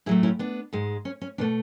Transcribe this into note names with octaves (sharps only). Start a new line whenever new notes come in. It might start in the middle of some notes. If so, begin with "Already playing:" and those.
A2 F#3 A3 E4 G#4
C#4 E4
B3 D4
G#2 G#3
C#4
C#4
B2 A3 B3 D4